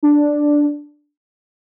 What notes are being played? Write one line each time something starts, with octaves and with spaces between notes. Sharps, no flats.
D4